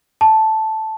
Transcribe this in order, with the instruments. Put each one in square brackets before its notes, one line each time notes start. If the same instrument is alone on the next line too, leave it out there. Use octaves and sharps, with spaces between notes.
[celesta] A5